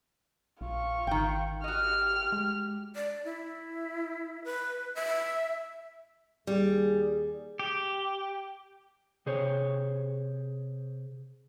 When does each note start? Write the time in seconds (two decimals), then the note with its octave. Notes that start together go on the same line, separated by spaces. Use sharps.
0.61 A#1 F4 C#6
1.07 G#1 D#3 G5
1.64 F#4 G4 D#5 F6
2.32 G#3
2.96 D5
3.24 E4
4.44 B4
4.95 E5
6.47 D#2 G3 G#4
7.59 G4
9.26 C3 G#4 C5 C#5